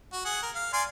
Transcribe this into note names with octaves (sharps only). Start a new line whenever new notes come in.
F#4
G#4 F#5
A#4
F5
D5 G#5 C6